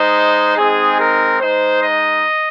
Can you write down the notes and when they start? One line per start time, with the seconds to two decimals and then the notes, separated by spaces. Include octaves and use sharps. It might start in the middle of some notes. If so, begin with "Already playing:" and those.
Already playing: G#3 D#4 C5
0.57 G#3 C4 D#4 G#4
0.99 A#4
1.41 G#3 D#4 C5
1.83 D#5